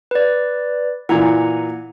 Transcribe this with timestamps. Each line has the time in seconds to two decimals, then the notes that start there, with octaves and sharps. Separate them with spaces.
0.11 B4 D5
1.09 A#2 E3 F#5 A#5 G#6